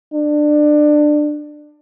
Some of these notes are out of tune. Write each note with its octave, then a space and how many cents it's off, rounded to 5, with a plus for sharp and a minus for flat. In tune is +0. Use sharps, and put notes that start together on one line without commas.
D4 +20